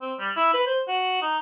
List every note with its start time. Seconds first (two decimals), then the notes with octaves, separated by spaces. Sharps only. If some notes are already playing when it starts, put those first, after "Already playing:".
0.01 C4
0.19 G3
0.36 E4
0.54 B4
0.67 C5
0.88 F#4
1.22 D#4